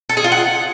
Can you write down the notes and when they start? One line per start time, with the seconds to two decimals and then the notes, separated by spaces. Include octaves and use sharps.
0.09 A4
0.17 G#4
0.24 F4
0.32 F#5